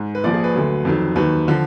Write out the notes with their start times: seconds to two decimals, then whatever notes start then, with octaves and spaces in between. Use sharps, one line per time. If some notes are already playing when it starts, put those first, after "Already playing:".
Already playing: G#2
0.15 B4
0.24 A#1 A#2 F3 D5
0.34 G#4
0.44 B4
0.54 D2 D3 F#3
0.85 F2 D#3 F#3
1.15 D#2 D#3 F#3 B4
1.48 D3 F3